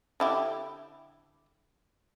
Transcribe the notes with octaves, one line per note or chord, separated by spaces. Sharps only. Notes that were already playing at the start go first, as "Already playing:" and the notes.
D3 E4 G4